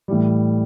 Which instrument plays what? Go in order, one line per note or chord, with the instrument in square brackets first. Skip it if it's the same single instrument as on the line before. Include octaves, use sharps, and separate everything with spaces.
[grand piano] A2 E3 G3